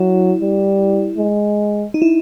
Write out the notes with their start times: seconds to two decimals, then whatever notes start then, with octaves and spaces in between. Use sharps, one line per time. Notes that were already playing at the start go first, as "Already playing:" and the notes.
Already playing: F#3 E4
0.42 G3
1.18 G#3
1.94 D#4
2.02 E4